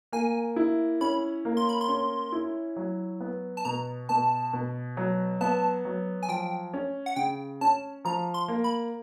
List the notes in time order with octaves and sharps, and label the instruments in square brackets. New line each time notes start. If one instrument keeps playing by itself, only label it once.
[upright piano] A#3 [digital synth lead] G#5
[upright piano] E4
[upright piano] C#4 [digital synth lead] B5
[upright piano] A#3
[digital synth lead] C6
B5
C6
[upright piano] C#4
E4
F#3
B3
[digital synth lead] A5
[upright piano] B2 [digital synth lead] A#5
[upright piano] B2 [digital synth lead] A5
[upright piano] B2
F#3
[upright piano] B3 [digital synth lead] A5
[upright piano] F#3
[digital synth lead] G#5
[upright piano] F3 [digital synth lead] G5
[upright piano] C#4
[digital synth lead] F#5
[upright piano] C#3 [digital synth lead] G5
[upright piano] C#4 [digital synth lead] A5
[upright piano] F3 [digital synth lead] A#5
[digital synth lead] C6
[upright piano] A#3
[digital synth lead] B5